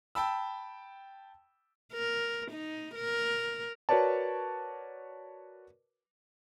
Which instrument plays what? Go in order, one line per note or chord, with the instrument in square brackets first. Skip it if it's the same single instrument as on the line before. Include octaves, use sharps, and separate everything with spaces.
[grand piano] G5 A5 B5 E6
[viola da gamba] A#4
D#4
A#4
[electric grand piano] F#4 A#4 B4 C#5 D5 A5